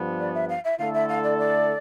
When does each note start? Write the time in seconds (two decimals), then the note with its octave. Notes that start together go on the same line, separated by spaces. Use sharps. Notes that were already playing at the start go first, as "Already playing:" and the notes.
Already playing: G2 F3 B3
0.19 D5
0.34 E5
0.49 F5
0.64 E5
0.78 D3 A3 E4 A4 F5
0.93 E5
1.08 F5
1.23 D5
1.38 D5